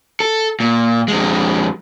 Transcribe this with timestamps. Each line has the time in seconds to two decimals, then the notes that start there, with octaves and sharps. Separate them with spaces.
0.20 A4
0.60 A#2
1.08 F2 G#3